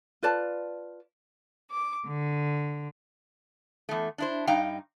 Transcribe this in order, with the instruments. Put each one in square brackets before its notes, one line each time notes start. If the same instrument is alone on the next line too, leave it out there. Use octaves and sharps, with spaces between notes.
[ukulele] F4 B4 D5 A5
[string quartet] D6
D3
[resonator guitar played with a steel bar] E2 A3
D4 E4 C5
G2 D#4 F5 G5 A#5